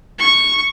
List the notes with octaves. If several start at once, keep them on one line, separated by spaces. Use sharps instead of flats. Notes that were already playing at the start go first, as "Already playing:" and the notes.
C#6